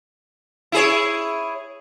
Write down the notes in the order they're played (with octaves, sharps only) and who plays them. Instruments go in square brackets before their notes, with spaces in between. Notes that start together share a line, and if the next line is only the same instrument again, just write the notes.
[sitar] E4 G#4 C#5